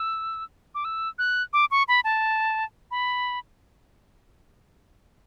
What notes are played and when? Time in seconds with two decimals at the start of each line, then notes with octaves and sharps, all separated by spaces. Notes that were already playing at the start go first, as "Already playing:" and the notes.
Already playing: E6
0.75 D6
0.85 E6
1.19 F#6
1.53 D6
1.71 C#6
1.88 B5
2.04 A5
2.91 B5